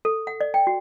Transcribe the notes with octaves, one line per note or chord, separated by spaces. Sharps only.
A4
F#5
D5
G5
F#4